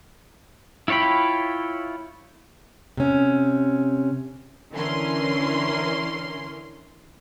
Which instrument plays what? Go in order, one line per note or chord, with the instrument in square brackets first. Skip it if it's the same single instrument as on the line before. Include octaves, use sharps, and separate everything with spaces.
[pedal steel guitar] E4 F4 C#5 G5 B5
[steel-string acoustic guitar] C3 C#4
[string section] D3 E3 C#4 A#4 C6